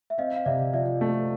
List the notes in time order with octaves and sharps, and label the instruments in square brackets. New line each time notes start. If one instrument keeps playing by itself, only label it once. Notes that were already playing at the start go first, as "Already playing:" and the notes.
[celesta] E5
[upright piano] C4 [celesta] D#5 F5
[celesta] F5
[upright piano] C3 [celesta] D5 E5
[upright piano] F3 [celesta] D5 E5
[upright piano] A3